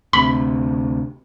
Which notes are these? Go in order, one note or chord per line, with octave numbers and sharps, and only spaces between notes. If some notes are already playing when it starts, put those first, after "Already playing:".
D2 C3 B5